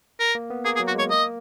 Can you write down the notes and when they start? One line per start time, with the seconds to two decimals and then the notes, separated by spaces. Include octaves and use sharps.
0.20 A#4
0.35 A#3
0.50 B3
0.65 A#3 G#4
0.76 G#4
0.80 F#3
0.87 F#4
0.95 G#3 C#5
1.09 A#3 D#5